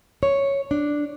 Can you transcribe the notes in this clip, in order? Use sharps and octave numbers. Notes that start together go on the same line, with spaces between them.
C#5
D4